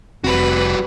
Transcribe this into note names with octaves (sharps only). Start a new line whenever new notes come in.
F1 E3 G3 C4 F#4 B4